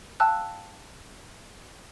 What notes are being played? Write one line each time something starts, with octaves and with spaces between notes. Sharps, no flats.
F5 G5 A5 E6 F#6